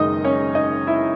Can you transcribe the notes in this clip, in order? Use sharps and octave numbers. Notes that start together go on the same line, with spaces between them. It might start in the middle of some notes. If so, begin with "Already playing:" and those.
Already playing: F#1 F#2 D#3 G#3 D#4 D#5
C#4 C#5
D#4 D#5
E4 E5